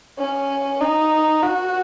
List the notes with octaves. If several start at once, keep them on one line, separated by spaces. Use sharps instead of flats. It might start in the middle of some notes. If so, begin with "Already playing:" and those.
C#4
D#4
F#4